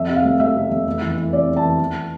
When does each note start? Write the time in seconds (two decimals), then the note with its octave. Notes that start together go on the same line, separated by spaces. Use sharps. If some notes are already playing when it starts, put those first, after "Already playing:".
Already playing: F2 E5
0.09 C3
0.16 F5
0.24 F1
0.40 F1 E5
0.56 C3
0.71 F1
0.86 E2
1.02 E3
1.18 E3
1.32 C3 D5
1.49 E2
1.57 A5
1.64 E3
1.79 E3